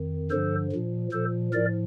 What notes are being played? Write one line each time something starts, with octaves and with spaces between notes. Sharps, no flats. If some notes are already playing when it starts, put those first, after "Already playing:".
Already playing: F2 D#3
G2 D3 F3 A4 C5
A#2 F3
A#2 F3 A4 C5
A2 F3 A#4 D5